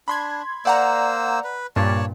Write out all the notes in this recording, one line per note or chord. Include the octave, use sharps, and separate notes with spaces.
D4 B5 C6 G#6
A#3 C5 D5 F#5 A#5 E6
B4
G2 A#2 C#5 D5 A5